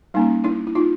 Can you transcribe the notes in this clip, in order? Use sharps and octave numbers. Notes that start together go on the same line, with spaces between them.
G3 A#3 C#4 D#4
D4 E4
E4
D#4 F4